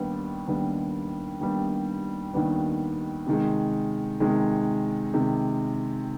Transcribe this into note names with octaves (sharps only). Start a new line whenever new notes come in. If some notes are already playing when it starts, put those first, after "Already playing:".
Already playing: D#2 D#3 G3 B3 D4
D#2 D#3 G3 B3 D4
D#2 D#3 G3 B3 D4
D#2 D#3 G3 B3 D4
C3 D#3 G#3
C3 D#3 G#3
C3 D#3 G#3